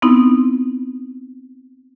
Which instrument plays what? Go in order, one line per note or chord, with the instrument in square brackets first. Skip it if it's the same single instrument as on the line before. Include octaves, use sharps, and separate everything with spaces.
[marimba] B3 C4 D#4 E4